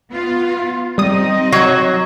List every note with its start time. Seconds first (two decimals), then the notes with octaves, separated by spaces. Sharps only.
0.11 B3 F4
0.98 G3 C4 D#4 D#5 D#6
1.52 F#3 C#5 G#6